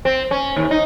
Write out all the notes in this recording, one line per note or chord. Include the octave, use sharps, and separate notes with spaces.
C4
C#4
D#2
D#4